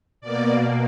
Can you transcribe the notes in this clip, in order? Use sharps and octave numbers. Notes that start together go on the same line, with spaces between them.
B2 A#3 D5